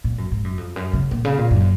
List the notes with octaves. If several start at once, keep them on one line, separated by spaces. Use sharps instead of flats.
A#2
F#2
G#2
F#2
F2
F#2
C#3
A#2
C#3
A#2
F#2